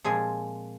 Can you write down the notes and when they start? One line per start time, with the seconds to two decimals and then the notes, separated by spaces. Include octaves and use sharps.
0.04 A#2 F3 G#3 C4 G#4 G#5